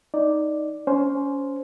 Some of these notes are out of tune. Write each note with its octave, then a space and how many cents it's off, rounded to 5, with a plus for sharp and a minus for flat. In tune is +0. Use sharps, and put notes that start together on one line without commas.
D#4 +0 D5 +0
C#4 +20 C5 +0